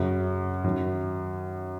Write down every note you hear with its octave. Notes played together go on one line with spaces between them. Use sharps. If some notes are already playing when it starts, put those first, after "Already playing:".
Already playing: F#2 C#3
F#2 D#3